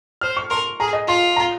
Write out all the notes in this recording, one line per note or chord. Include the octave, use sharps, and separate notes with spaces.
C5 F6
C#6
A#4 C6
G#4 A#5
D#5
F4 C6
A#5